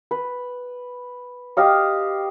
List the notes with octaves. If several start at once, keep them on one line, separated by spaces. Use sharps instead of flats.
B4
G4 D#5 F5 D#6